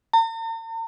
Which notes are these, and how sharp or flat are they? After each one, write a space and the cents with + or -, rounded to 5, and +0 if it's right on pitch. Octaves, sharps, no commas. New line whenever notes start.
A#5 -45